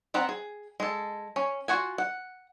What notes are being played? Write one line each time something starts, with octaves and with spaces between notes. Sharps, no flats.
B3 C4 F#5 A#5
G#4
G#3 A4
C#4
F4 F#4 F#5 G#5
F#5